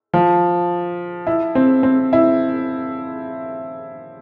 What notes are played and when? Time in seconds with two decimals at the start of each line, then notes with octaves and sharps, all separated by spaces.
0.14 F3
1.27 E4
1.55 C4
1.83 C4
2.13 E4